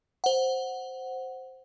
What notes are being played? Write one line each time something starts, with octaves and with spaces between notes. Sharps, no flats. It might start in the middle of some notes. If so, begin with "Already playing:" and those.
C5 F#5